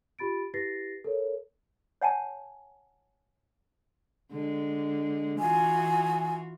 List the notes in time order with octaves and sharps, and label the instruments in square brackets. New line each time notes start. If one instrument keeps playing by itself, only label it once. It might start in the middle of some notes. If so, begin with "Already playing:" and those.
[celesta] F4 G4 B5 A6 D7
E4 G4 B4 A6 A#6 C7
A4 A#4 C#5
[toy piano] C#5 F#5 G#5 A5
[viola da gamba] D3 G#3
[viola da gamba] E3 F4 F#4 [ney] G#5